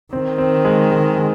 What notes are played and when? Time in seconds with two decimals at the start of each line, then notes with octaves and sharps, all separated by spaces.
0.13 D#3 C4
0.38 C4
0.65 G#3
0.91 G#3
1.17 G#3